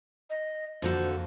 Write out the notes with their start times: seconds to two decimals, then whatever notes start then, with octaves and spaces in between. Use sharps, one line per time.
0.30 D#5
0.82 F2 D3 F3 A#3 F#4 A4 C5